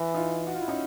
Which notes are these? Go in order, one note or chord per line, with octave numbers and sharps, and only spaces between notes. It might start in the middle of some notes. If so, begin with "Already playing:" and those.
Already playing: E3
D#4 F4
F#4
F4
E4
C#4 D#4